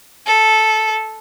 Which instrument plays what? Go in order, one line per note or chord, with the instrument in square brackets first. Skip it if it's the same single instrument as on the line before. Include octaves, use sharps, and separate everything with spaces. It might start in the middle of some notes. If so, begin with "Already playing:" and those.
[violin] A4